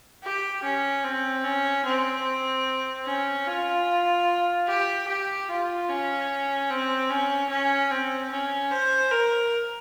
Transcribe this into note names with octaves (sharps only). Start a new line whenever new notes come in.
G4
C#4
C4
C#4
C4
C#4
F4
G4
G4
F4
C#4
C4
C#4
C#4
C4
C#4
C5
A#4